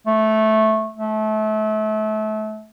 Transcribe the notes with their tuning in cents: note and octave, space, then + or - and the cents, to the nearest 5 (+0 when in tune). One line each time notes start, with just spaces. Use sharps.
A3 -10
A3 -30